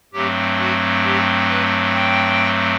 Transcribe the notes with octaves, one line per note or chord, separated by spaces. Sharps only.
G2 F#3 A3 C4 G4
F#4
G4
B4
G5